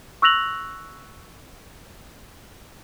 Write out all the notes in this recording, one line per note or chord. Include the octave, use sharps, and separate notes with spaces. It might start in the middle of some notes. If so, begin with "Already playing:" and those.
C#6 E6 F#6 A#6 F7 F#7